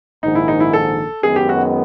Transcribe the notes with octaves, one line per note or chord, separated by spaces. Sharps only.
A#1 G#2 D#3 D#4
E4
D#4
E4
A4
F#2 D#3 G#3 B3 G#4
G4
F#4